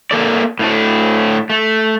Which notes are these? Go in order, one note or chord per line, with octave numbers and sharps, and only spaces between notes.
A#3 A4 D5
A2 A3 D4
A3